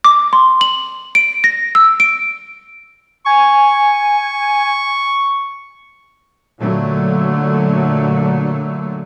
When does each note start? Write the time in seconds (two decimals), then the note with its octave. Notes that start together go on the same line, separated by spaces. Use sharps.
0.04 D6
0.33 C6
0.61 F#7
1.15 D7
1.44 A#6
1.75 E6
2.00 D7
3.26 G#5 C#6
6.58 A#2 D3 F#3 A3